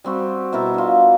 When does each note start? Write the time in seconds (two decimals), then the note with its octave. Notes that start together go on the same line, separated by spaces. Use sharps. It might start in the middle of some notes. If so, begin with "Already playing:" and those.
0.04 G3 C4 F#4
0.52 B2 E4 A#4 A5
0.74 D4 F4